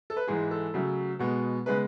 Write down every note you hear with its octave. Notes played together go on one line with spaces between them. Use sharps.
A4
B4
G#2 E3 G#3 G#4
A4
C#3 F#3 A3
B2 G#3 B3
C#3 G#3 B3 B4